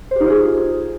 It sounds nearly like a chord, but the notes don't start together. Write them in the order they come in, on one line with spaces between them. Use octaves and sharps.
C5 G4 D#4 F4 G#4